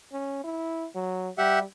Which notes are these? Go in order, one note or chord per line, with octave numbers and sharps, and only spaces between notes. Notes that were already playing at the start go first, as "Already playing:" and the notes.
C#4
E4
F#3
G3 G4 E5 F#5